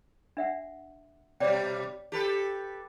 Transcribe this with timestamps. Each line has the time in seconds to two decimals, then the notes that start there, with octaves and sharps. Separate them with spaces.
0.37 D4 E5 F#5
1.40 B2 G3 C#5 D5 G5
2.12 G4 A4 B4